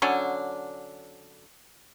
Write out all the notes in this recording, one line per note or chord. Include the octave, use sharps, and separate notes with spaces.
D3 F#3 C#4 D4